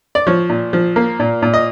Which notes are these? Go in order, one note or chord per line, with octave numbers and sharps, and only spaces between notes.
D5
F3 C#5
A#2
F3
A#3
A#2
A#2
D#5